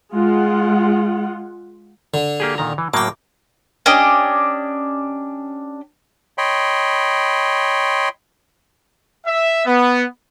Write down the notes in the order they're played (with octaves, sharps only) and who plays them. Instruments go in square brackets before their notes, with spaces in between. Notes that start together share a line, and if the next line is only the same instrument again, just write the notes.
[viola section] G#3 F4 F#5
[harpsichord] D3
[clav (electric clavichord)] A#3 G4 G#4
A#2 D#3 A#5
E3
[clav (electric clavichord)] A2 F#3 A#3 [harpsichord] G5 D6
[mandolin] C#4 D4 G4 D#5
[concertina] C#5 D#5 G5 B5 C6
[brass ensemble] E5
B3